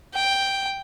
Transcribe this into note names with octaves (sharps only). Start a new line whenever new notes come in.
G5